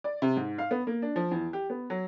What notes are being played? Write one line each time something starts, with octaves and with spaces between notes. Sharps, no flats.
D5
C3
G#2
F5
B3
A#3
D4
F3
E2
G4
B3
F#3